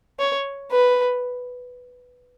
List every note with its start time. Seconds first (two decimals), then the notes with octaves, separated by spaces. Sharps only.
0.19 C#5
0.72 B4